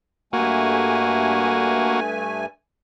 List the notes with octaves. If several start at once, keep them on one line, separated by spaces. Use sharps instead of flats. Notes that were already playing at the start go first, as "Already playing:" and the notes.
G2 A3 A#3 F#4 G#5